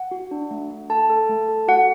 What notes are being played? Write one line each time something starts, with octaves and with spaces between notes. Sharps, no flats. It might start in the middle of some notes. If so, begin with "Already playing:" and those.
Already playing: F#5
F#4
D4
A3
A3
A4 A5
A4
A3
A4
F#4 F#5